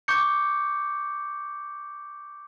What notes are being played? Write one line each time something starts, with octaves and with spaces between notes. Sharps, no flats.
C#6 D6 G6 C#7